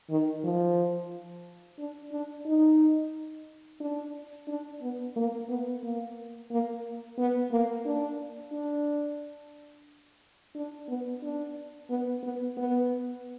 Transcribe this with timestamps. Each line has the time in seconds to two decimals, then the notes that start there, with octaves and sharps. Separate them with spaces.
0.10 D#3
0.44 F3
1.79 D4
2.12 D4
2.46 D#4
3.81 D4
4.48 D4
4.82 B3
5.16 A#3
5.49 B3
5.83 A#3
6.51 A#3
7.18 B3
7.52 A#3
7.86 D4
8.52 D4
10.56 D4
10.89 B3
11.23 D4
11.90 B3
12.23 B3
12.57 B3